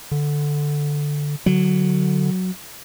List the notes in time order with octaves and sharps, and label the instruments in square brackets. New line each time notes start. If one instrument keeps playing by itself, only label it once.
[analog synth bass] D3
[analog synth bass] D3 [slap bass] F#3